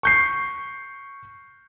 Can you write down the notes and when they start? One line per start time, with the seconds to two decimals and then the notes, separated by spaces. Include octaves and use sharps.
0.03 C#6 G6 C7